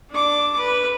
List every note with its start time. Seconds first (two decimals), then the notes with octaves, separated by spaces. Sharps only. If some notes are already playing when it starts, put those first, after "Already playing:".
0.10 D4 D6
0.58 B4